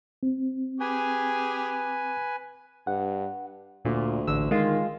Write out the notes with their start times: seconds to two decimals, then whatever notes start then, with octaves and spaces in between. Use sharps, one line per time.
0.23 C4
0.80 G4 G#4 B4 G#5
2.87 G2 F#5
3.85 D2 A#2
4.27 A1 D3 E6
4.51 D#3 G#3 F4